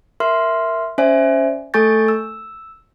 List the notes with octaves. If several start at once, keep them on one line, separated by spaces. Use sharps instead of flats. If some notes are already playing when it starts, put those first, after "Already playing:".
A#4 E5 C6 F6
C#4 C5 D5 E5 G#5
A3 A4 G#5 C#6 G6 A6
E6